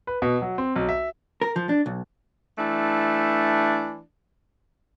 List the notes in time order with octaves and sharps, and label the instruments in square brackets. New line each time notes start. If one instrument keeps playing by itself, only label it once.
[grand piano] B4
B2
F#3
C4
B1
E5
[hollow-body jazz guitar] A#4
F3
D4
B1
[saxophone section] E3 A3 D4